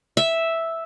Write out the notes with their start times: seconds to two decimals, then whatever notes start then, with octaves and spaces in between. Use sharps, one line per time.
0.17 E5